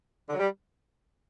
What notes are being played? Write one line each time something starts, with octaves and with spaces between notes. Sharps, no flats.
D3
F#3
G3